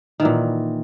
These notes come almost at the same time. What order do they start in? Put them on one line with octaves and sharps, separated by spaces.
D#3 E3 A#2